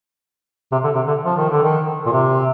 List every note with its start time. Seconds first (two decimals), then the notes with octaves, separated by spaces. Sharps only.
0.72 C3
0.84 D3
0.95 C3
1.07 D3
1.25 F3
1.37 D#3
1.50 D3
1.63 D#3
2.06 A#2
2.12 C3